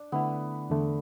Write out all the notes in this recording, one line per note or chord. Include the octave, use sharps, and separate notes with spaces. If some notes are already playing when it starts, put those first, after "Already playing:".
Already playing: D4
D3 A3 B3 E4
E2 D3 A3